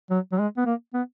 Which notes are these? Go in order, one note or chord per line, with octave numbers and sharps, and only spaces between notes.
F#3
F#3
G#3
B3
A#3
B3